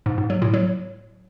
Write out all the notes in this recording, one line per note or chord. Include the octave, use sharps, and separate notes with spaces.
G#2
G#2
F#3
A2
F#3